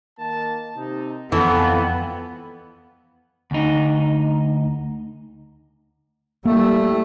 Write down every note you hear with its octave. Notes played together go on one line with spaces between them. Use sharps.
D#3 A#3 A5
C3 D#4
F2 E3 B3 A4
D2 D#4
G3 A3 A#3 E4